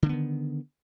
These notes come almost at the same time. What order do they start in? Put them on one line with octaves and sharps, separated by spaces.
D3 A#3 B3 D#3